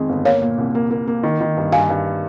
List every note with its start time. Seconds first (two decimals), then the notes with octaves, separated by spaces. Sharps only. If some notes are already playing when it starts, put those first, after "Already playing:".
Already playing: F2 D#3 G#3
0.09 G1
0.25 A#3 C#5 F5
0.41 A#2
0.58 C2
0.75 A#3
0.91 A#3
1.07 A#3
1.23 D#3
1.41 D#3
1.57 G2
1.72 G2 F5 G#5
1.90 G2